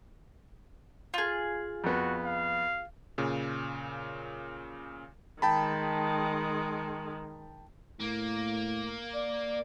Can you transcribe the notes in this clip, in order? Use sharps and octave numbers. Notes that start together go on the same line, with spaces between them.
F4 G#4
F2 B3 F#4
F5
A#2 C#3
D#3 G#3 G5 A5 B5
A2 A#3
D5